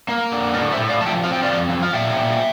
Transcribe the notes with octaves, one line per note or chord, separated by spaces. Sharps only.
A#3
D3
A2 A#4 D5
C5 E5
A2
D5 F5
F3 A5
E5 G5
C4 F5
G5
F3 D5 F5
F3
F5
A#2 E5 G5
A#2